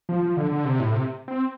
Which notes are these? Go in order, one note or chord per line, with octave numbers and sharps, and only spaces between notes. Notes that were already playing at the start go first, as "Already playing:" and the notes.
F3
F3
D3
D3
C3
A2
C3
C4